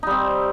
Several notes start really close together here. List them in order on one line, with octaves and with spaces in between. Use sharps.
D#4 G3 C4